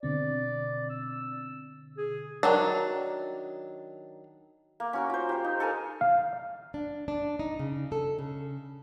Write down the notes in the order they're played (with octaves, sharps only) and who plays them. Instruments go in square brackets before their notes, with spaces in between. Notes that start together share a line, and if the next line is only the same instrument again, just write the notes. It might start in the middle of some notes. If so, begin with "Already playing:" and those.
[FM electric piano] B2 D3 C4 [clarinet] D5
[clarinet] E6
G#4
[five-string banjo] D#3 F#3 D4
[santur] A#3
C#4 F#4 A#4
F4 C5
G4 C5
D#4
A4 A#4 G#5 A5
[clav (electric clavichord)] F5
[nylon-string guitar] D4
D4
D#4
C#3
A4
C#3